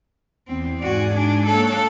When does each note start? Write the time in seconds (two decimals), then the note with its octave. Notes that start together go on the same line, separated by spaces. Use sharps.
0.47 E2 C4
0.80 G#2 F#4 D5 G#5
1.15 D4
1.46 A#3 A4 C#5 F#6